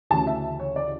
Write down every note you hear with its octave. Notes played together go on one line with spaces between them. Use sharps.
D2 C#3 E3 A5
E5
C#5
D5